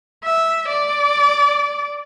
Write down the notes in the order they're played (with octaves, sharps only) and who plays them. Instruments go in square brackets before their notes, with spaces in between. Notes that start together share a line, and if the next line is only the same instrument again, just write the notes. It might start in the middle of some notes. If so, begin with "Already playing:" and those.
[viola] E5
D5